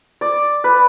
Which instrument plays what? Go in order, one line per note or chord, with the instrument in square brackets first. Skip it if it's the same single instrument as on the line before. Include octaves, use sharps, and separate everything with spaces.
[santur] D5
B4